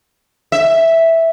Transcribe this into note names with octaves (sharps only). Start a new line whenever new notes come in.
E5